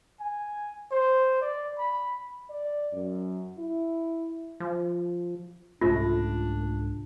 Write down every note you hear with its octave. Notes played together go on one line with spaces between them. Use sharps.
G#5
C5
D5
B5
D5
F#2
E4
F3
C2 G#2 A3 C#4 D4 F4